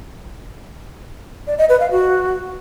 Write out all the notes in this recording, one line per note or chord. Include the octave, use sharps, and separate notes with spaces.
D5
D#5
B4
F5
F#4